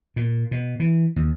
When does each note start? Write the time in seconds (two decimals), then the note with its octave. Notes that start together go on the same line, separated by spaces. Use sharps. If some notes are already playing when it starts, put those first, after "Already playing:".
0.16 A#2
0.51 B2
0.80 E3
1.16 D#2